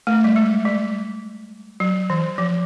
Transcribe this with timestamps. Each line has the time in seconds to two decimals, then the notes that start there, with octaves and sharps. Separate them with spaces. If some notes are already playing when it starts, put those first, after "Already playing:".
0.07 A3
0.24 G3
0.36 G#3
0.65 G3
1.80 F#3
2.10 E3
2.38 F3